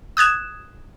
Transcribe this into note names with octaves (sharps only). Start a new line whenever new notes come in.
D#6 F#6 G#6 E7